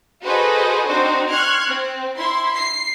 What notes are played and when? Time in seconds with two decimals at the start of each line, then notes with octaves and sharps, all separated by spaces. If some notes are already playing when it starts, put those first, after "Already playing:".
0.25 F#4 G#4 A4 B4 C5 D#5
0.86 C4 D4 D#4 F#4 C5
1.29 C6 C#6 F6 F#6 G#6
1.66 C4
2.17 E4 C6
2.56 C7